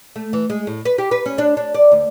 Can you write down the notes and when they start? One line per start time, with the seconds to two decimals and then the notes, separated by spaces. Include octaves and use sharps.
0.16 A3
0.33 E3
0.50 G#3
0.67 A2
0.85 B4
0.98 G4
1.11 B4
1.26 C#4
1.38 D4
1.57 D4
1.75 D5
1.92 D2